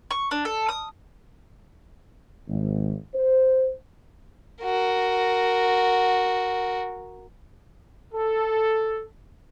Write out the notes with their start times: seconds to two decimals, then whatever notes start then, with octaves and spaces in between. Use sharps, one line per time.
0.11 C#6
0.31 D4
0.45 A4
0.69 D#6
2.49 G#1
3.14 C5
4.62 F#4 A#4
8.14 A4